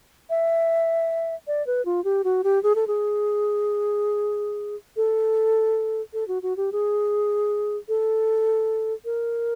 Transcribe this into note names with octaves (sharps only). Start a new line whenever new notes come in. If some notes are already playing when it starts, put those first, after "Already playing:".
E5
D5
B4
F4
G4
F#4
G4
G#4
A4
G#4
A4
A4
F#4
F#4
G4
G#4
A4
A#4